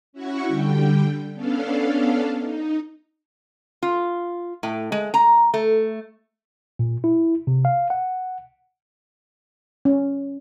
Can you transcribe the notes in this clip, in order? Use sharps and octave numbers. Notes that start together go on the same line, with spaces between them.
C#4 E4 F#4 F#5 C#6
D3 G3 G5
B3 C#4 D4 A4 F5
D#4
F4
A2
G#3
A#5
A3
A#2
E4
C3
F5
F#5
C#4